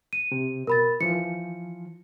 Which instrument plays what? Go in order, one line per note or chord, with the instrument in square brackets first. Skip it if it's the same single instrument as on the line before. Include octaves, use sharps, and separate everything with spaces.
[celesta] D#7
[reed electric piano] C3
[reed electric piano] B2 [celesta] A#4 B5 A6
[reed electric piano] E3 F3 [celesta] C#7